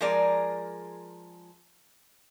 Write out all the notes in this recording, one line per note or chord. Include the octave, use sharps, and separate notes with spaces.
F3 G#3 G#4 A#4 D5